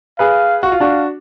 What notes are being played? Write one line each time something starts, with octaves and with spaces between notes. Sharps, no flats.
G#4 B4 F5
F#4 F5
F4
D4 F#4